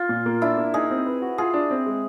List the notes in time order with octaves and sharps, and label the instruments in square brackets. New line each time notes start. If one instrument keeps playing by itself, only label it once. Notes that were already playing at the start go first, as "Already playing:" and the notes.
Already playing: [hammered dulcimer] F4
[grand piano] A#2
A#3
[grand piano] D4 [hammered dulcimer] E4
[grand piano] A#3
[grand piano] D#4 [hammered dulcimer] G#4
[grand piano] C4
B4
F#4
[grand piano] F4 [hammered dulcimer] G#4
[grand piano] D4
C4
G#3